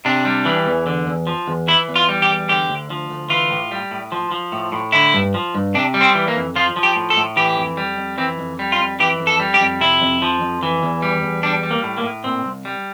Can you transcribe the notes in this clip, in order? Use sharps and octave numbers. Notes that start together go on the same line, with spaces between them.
C3 D4
G3
E3
E2
D3
E2
F3
E2
E3 E4
E2
F4
G3
G4
E2
D3 G4
D2
F3
D2
E3 F4
A2
G3
A2
F3
F3
A2
A2
D3 E4
G2
F3
G2
C3 D4
G3
C4
E3
A#3
F2
F3 F4
F3
G4
A2
A4
A2
E3 G4
F2
G3
F2
E3 C4
F2
G3
F4
F2
E3 G4
F2
A4
G3
G4
F2
C3 E4
F2
F3
F2
E3
E2
G3
E2
G3 D4
G3
A#3
A2
A#3
A2
A#2 C4
C2
G3